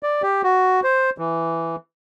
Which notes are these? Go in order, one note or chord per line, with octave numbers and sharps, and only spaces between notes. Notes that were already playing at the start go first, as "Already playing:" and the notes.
D5
G4
F#4
C5
E3